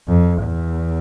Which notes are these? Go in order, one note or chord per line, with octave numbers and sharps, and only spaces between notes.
F2
E2